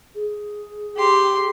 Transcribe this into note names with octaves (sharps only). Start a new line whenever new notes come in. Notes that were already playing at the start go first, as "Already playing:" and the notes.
G#4
G4 C6